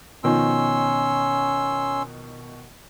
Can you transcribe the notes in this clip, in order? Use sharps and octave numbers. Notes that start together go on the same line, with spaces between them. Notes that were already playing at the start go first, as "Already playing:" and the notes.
B2 D#3 F3 C#4 C6 E6